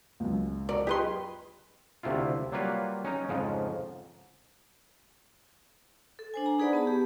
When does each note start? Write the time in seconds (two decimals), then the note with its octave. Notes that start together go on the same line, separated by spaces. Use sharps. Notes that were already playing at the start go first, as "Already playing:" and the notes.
0.20 C#2 F#2
0.69 F2 F#4 A#4 D5
0.87 F4 G4 G#4 B4 D#5 C6
2.03 D2 C3 A3 E4 F4
2.52 F#3 G3 A#3 F4 B4 C#5
3.05 C#4 D#4 A#5
3.29 F2 G#2 C#3 F3
6.19 A4
6.34 D4 C5 G#5
6.46 A#5
6.59 D#4 G#4 B4 D5 F#5 B5
6.73 B3 A5 B5
6.87 G4